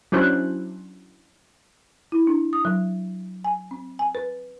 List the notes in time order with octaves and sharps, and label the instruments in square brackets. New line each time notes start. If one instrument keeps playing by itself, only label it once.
[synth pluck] F#3 C#4 D4 E4 C5 F#6
[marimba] E4
D4
D#6
F#3
G#5
C4
G#5
B4